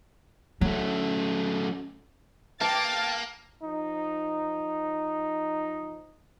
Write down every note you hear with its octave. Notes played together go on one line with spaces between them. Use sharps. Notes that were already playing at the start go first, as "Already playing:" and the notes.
F#3 A3 C#4
A#3 F5 G5 A5 D6 A6
F3 D#4